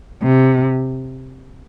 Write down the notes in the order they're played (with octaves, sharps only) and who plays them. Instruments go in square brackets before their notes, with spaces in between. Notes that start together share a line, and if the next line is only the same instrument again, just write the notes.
[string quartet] C3